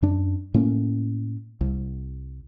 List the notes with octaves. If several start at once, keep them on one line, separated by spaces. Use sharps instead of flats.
F#2 D4
A2 A#3 C#4
C2